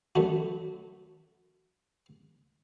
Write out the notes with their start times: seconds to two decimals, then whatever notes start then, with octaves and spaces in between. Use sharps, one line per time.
0.15 F#2 A3 F#4